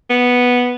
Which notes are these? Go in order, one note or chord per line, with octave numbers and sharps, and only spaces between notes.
B3